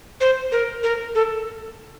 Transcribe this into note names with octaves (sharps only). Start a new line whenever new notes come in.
C5
A#4
A#4
A4